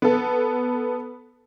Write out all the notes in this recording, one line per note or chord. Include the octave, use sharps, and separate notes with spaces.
B3 A4